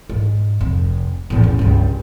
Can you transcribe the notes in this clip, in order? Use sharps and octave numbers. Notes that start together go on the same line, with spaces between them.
G#2
F1
E2 A2
C#4
C#2 G2